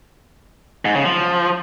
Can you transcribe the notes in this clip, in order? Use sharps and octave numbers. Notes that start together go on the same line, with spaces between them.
G#2
C#3
F3